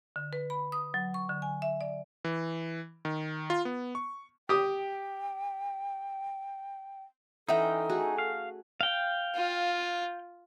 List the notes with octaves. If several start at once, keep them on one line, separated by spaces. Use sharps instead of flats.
D3
B4
B5
D#6
F#3
C#6
D3
G#5
E5
D5
E3
D#3
F4
B3
C#6
G4 G5 D#6
E3 C#4 D#4 A4 E5 F#5 G5 A#5
A3 F#4 G#4
F5
F5 G5
F4